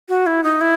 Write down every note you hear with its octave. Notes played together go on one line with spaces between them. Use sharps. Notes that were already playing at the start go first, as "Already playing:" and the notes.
F#4
E4
D#4
E4